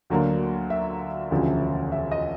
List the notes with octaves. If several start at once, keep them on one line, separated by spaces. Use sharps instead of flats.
D2 D3 F#3 A#3
E5
E1 D2 C#3 F3
E5
D#5